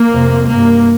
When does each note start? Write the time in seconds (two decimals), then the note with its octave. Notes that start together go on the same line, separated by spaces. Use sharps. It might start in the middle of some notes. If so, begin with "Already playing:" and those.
Already playing: A#3
0.10 F2 C3
0.48 G2 A#3